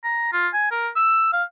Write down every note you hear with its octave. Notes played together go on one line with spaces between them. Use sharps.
A#5
F4
G#5
A#4
E6
F5